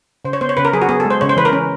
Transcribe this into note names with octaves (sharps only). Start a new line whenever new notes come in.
C#3 C5
C#5
B3 C5
C#5
C#3 B4
A#4
F#3 G#4
F#4
B3 G#4
A4
G#3
C5
C#3 C#5
C5
E3 B4
A#4
C#4